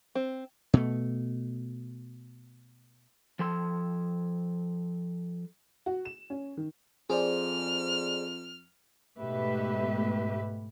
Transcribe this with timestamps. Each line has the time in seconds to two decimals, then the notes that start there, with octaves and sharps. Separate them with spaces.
0.15 C4
0.73 B2 A3
3.39 F3 A4 C6
5.86 F#4
6.05 E7
6.30 C#4
6.57 D#3
7.10 F2 G#4 C5 D5 F6
9.18 G#2 B2 A3 G4 B4 E5